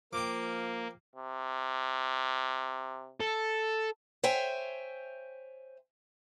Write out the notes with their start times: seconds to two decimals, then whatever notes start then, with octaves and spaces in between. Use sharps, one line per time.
0.13 F3 A#3 G5 D6
1.16 C3
3.21 A4
4.24 C5 C#5 E5 G5 G#5